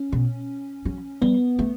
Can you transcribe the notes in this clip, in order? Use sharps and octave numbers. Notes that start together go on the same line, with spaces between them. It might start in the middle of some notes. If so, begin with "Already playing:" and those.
Already playing: C#4
B2
F#3
G3 B3
A3